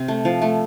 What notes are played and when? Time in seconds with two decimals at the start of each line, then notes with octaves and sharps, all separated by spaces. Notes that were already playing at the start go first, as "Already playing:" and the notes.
Already playing: C3 C4
0.08 A3
0.25 F3
0.42 A3